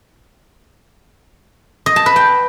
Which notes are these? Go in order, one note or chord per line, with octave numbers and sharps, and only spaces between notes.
D#5
A5
B4
G5